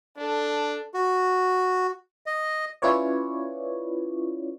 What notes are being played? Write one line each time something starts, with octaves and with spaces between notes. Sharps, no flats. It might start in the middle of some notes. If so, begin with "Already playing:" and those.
D4 A4
F#4
D#5
C#4 E4 F4 B4 C#5 D5